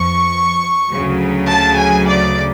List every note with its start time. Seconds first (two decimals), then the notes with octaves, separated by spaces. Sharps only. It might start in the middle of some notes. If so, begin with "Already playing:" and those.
Already playing: F2 F3 C#6
0.91 D2 C#3 F#3
1.49 A5
1.77 G#5
2.06 D5